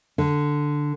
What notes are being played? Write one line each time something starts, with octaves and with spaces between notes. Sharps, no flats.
D3